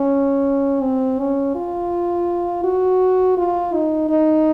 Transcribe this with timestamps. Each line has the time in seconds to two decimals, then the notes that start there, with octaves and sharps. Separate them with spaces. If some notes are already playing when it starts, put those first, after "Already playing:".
Already playing: C#4
0.81 C4
1.19 C#4
1.55 F4
2.64 F#4
3.37 F4
3.74 D#4
4.09 D#4